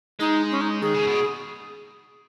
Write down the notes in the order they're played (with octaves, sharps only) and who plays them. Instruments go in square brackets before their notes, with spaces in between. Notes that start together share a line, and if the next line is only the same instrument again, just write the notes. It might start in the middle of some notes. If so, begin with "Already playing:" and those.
[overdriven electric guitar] G#3 [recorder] D#4
[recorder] C#4
D#4
[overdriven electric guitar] D#3 [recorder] G#4
[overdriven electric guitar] C#3
B2